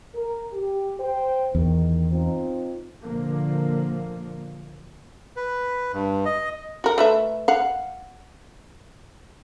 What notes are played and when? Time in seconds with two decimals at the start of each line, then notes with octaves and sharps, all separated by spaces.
0.15 A#4
0.53 G4
0.99 C5 G5
1.55 E2 D#3
2.11 C4 D#4 F4
3.01 A#2 D3 F3 A#3
5.36 B4
5.93 G2
6.25 D#5
6.84 F#4 A#4
6.98 A3 B4 E5
7.48 F5 F#5